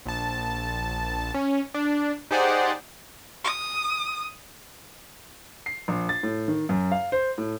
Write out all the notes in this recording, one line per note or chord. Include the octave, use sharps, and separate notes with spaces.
A#1 A5
C#4
D4
D#4 G4 G#4 C5 D5 F#5
D#6
C7
A#1
A6
A2
D#3
F#2
F5
C5
A2